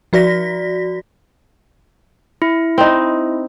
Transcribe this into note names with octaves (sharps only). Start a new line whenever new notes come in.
F3 F#4 D5 A#6 B6
E4
C4 D#4